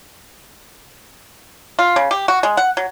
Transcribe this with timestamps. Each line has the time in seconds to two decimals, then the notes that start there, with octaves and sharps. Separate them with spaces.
1.79 F4
1.96 C#3
2.11 G4
2.28 F#4
2.43 G#3
2.57 F#5
2.77 F#3